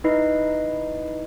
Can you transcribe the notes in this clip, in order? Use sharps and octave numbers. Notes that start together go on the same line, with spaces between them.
D#4 E4 B4 D#5 C7